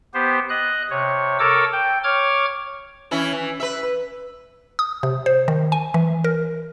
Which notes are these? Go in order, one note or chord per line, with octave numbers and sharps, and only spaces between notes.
B3 G4 C5
D#5 F#6
C3 C#5
A4 A#4 C#5 D6 E6
G5
C#5 D6 F6 G#6
E3 C#4 E4
E3
B4 E5
B4
D#6
C3
C5
D#3
G#5
E3
A#4